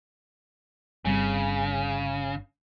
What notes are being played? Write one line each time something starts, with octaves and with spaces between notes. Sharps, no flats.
G1 C#3 G3 C4